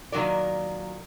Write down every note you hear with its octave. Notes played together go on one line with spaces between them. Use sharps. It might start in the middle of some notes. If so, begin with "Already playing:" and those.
A#2 D#3 F#3 A#4 D5